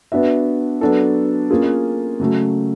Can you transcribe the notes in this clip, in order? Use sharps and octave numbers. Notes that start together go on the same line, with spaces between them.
B3 D4 F#4 B4 E5
F#3 B3 D4 F#4 A4
A#3 C#4 F4 G#4
C#3 F#3 A3